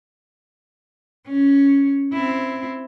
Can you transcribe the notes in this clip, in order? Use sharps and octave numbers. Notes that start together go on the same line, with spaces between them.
C#4
C4 E4